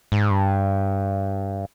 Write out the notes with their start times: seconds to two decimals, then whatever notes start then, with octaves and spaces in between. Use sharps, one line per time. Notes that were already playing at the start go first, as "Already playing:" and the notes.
0.12 G#2
0.30 G2